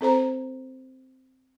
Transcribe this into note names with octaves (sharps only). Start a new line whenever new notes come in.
C4 A4 C5 A#5